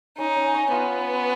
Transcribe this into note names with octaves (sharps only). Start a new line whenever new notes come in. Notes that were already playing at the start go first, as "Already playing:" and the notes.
C#4 D#4 C#5
C#4 C#5
C#4 C#5
B3 F4 F5